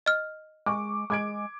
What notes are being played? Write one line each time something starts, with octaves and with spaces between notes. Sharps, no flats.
D#5 F6
G#3 C#6 D6
G#3 D6 G#6 D7